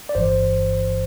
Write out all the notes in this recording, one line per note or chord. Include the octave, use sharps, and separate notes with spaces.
D5
G1 G2 E3 C5